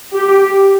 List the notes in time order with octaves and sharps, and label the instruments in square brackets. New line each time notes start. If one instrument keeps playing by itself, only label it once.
[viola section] G4